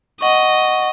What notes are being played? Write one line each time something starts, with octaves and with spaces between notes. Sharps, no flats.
D#5 F#5 C#6